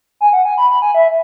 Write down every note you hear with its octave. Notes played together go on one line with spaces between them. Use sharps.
G#5
F#5
G#5
B5
B5
G#5
E5